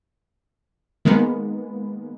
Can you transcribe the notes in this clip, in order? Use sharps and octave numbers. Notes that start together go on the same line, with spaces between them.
D#3 G#3 A#3 B3